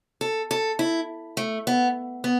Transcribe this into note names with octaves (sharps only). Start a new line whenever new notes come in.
A4
A4
E4
A3
B3
B3